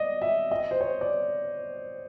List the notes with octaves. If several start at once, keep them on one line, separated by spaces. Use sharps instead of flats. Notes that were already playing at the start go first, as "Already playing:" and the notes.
Already playing: D5 D#5
E5
D#5
C5
C#5
D5